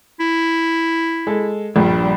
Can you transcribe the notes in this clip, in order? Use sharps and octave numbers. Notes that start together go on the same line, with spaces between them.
E4
G#3 A4
A#1 G2 G3